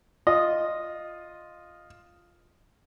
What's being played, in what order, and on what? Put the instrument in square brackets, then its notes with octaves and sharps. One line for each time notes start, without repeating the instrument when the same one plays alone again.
[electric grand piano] F4 [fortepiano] D#5